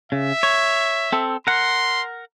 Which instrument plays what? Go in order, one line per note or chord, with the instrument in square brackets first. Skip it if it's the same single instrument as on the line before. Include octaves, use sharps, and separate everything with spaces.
[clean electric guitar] C#3 [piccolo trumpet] E5
[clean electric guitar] C#5
C4 A4
[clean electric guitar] A#4 F#5 [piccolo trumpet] C6